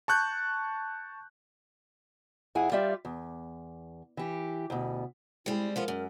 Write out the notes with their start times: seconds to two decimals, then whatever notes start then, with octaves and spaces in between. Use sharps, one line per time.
0.08 A5 C#6 F#6 G6
2.55 F2 E4 G#4 F#5 G#5
2.72 G3 F4 G4 D5 E5
3.05 E2
4.17 E3 G4
4.70 D2 B2
5.46 G3 G#3 C4 E4 G#4
5.76 F3 B3 F4 A#4
5.88 F#2